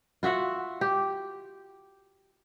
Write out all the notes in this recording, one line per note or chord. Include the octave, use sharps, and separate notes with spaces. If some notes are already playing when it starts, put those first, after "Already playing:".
F4 F#4 E5 F#5
G4